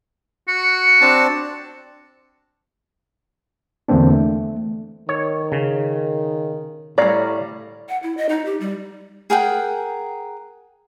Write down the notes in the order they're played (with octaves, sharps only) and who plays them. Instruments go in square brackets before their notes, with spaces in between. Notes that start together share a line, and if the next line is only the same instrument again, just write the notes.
[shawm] F#4 [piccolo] C#7
[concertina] C4 D4 A5
[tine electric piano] E2 D3 E3 A#3 C4 D4
A3
[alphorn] D#3 [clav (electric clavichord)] C#5
[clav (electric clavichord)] C#3
[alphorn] A2 [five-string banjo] G3 D5 [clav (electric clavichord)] C#5 F5 A#5
[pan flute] F#5
E4
D#5
D#4
G4
G3
[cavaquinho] G#4 A#4 F#5 G5